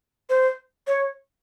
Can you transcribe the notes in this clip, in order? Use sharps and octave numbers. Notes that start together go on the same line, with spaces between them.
C5
C#5